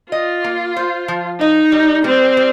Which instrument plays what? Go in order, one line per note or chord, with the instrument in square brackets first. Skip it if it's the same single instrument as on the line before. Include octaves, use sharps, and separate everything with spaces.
[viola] F4 [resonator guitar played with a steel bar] D#5
[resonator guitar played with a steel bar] A#3
C5
F3
[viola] D#4 [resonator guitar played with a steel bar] D#5
[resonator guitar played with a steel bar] G3
[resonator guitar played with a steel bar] G3 [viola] C4
[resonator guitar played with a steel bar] G3